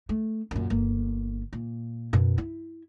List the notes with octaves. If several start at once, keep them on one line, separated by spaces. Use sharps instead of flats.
A3
F#2 A#2
G1 A#3
A#2
F#2 B2
E4